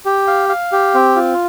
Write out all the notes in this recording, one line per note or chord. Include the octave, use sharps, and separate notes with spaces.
G4
F5
F5
G4
C4
F4